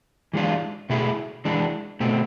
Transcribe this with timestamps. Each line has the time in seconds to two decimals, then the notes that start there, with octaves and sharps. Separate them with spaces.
0.33 E3 G#3 D4 F4
0.90 B2 A3 E4 G#4
1.45 E3 G#3 D4
2.00 B2 A3 C4